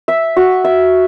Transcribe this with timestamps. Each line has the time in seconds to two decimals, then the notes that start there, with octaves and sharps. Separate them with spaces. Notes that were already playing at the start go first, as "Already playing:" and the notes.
0.08 E5
0.37 F#4
0.64 E5